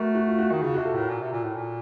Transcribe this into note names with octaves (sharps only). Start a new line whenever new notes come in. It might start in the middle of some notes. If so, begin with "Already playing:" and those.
Already playing: A3 F#4 A#4
F#4
F4
F#4
D#3 D#4
C#3 F4
C3 F#4
A4
A2 A#4
A#2
C3
A#2
A2
A#2